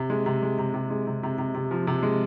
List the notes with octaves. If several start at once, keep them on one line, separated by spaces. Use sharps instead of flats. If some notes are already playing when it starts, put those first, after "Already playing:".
Already playing: C3
G#3
C3
G#3
C3
C3
G#3
C3
C3
C3
C3
F3
C3
G#3